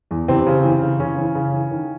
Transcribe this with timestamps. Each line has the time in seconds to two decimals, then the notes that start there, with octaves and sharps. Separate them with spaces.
0.11 E2
0.28 C3 E3 C4
0.47 C#3
0.64 E3
0.82 C#3
1.00 C#3 E3 C#4
1.18 E3
1.35 C#3
1.53 E3
1.71 D#3